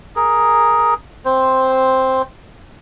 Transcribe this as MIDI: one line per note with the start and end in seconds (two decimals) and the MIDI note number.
0.16 0.94 68
0.16 0.94 70
1.25 2.22 60
1.25 2.22 72